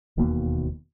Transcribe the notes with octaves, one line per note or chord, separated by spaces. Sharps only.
E1 D#2 B2 A#3